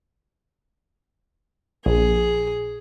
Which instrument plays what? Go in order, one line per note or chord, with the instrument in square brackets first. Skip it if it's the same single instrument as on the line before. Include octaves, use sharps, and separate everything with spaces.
[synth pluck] A#1 [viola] G#4